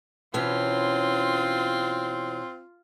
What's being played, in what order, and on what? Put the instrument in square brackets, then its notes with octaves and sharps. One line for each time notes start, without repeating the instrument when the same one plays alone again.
[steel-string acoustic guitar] B2 E3 C#4 [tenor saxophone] C4 [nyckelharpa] F4